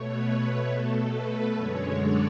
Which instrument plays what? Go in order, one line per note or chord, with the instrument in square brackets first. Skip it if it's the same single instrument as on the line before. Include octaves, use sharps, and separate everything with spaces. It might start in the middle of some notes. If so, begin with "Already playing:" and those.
Already playing: [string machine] B2 A3 C#5
B4
B4
B2 A3 A4
B4
F#2 D3 G#3 C#5
D5